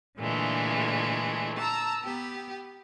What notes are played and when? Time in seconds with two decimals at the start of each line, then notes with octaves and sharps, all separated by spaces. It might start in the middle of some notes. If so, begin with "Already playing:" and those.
0.19 A#2 D3 E3 G#3 A3
1.59 A5 A#5 E6
2.02 B3 G4